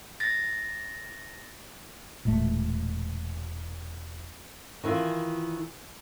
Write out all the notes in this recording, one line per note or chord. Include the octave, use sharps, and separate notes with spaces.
A6 A#6
E1 A#2 G#3 A3
D#3 E3 E4 F4